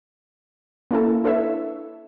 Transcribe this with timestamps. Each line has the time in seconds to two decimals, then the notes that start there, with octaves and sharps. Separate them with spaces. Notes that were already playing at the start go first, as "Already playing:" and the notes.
0.91 A#3 C#4 E4 A4
1.24 D4 E4 A4 B4 C#5 E5